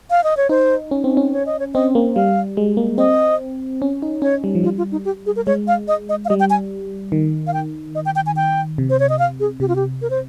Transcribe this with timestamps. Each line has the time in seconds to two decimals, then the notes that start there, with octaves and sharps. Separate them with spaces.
0.10 F5
0.24 D#5
0.37 C#5
0.49 D#4 C5
0.91 C#4
1.04 C4
1.17 C#4
1.33 C#5
1.46 D#5
1.59 C#5
1.74 C4 D#5
1.95 A#3
2.16 G3 F5
2.57 G#3
2.77 A#3
2.98 C4 D#5
3.82 C#4
4.02 D#4
4.22 C#4 C#5
4.44 G3
4.55 F3
4.64 G3 F4
4.78 F4
4.92 D#4
5.05 G4
5.26 G#4
5.36 A#4
5.47 G#3 C#5
5.68 F5
5.88 D#5
6.09 D#5
6.25 F5
6.29 G3 D#5
6.40 G5
6.50 G#5
7.12 D#3
7.47 F5
7.54 G5
7.95 D#5
8.06 G5
8.16 G5
8.26 G#5
8.36 G5
8.78 C3
8.90 C5
9.00 C#5
9.09 D#5
9.19 F5
9.40 G#4
9.60 C3 G4
9.68 F4
9.76 G4
10.02 A#4
10.10 C5